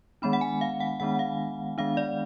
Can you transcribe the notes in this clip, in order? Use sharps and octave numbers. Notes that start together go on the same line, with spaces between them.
D#3 G#3 B3 D4 B5
F#5
G#5
F5
F#5
D#3 G#3 B3 D4 F#5
F5
D#3 G#3 B3 D4 F5
D5